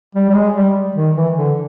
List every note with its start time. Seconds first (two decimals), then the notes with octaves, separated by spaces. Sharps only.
0.15 G3
0.30 G3
0.35 G#3
0.56 G3
0.96 D#3
1.16 E3
1.37 D3